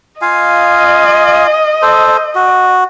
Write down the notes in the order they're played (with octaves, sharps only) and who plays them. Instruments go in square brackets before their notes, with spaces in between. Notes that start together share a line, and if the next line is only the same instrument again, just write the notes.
[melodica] F4 F5 G#5 [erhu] D#5
[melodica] A4 C5
F#4